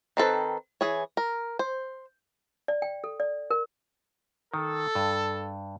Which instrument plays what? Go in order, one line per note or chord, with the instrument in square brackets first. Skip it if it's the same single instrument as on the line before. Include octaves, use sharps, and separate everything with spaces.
[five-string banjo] D#3 C4 A4 B4
E3 G#4 C#5
A#4
C5
[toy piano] D5
G5
A4
D5
A#4
[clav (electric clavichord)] D#3 [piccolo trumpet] A4
[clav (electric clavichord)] G2